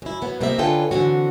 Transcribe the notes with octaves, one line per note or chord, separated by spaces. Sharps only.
F#2 E4
F#3 B3
C3 F3 A#3 C4 D#5 E5
D3 C#4 F4 A4 B4 G5
D3 E3 C4 C#4 F#4